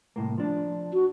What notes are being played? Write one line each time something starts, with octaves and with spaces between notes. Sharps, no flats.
C2 A2 A#3
F3 D4
F#4